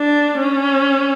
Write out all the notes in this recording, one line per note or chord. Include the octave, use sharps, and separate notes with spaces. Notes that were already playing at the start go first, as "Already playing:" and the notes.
Already playing: D4
C#4